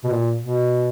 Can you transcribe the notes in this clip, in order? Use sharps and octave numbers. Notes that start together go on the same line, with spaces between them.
B2
A#2
B2